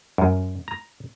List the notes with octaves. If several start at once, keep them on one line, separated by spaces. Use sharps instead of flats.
F#2
A#5